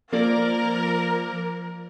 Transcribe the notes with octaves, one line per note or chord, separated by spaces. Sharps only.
F3 A#3 A#4 D5